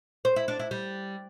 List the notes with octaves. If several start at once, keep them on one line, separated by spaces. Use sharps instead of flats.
C5
E4
D4
E4
G3